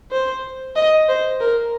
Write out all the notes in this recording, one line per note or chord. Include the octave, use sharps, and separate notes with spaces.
C5
D#5
C5
A#4